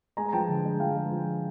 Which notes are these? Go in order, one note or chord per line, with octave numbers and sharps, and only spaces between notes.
G#3 G#5 A#5
A#5
F3 G5 A5
D3
G#3
F3 F5 G5
G#3
F3